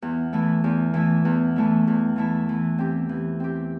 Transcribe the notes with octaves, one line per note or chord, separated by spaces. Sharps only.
E2
E3 A3 E4
E2
E3 A3 E4
E2
E3 A3 E4
E2
E3 A3 E4
E3
C4 G4
E3
C4 G4